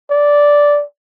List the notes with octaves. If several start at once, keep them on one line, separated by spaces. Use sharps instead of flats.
D5